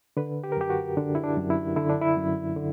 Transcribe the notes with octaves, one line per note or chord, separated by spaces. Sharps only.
D3 B4
G4
A#4
F#2 G4
F#4
D3 D4
E4
D4
F#2
E4
D3 E4
D4
E4
F#2
D3